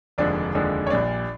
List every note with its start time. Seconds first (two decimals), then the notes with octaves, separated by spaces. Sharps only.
0.18 F1 D#2 D3 F3 G#3 D4 D5
0.54 F1 D#2 D3 F3 G#3
0.87 C#5
0.90 A#1 A#2 G3 D4 D5